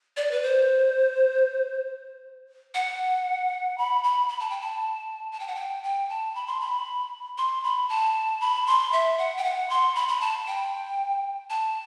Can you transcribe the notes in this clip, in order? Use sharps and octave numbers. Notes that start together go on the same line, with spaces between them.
D5
B4
C5
F#5
B5
B5
B5
A5
G5
A5
A5
G5
F#5
G5
G5
A5
B5
C6
B5
C6
B5
A5
B5
C6
E5
F#5
G5
F#5
C6
B5
B5
A5
G5
A5